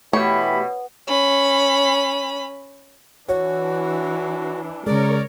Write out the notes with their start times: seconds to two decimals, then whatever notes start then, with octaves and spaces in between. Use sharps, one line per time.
0.13 B2 E3 A3 G4 C#5 B5
1.08 C#4 B5
3.28 E3 D4 F#4 C#5
4.86 C#3 G#3 A#4 C#5 D5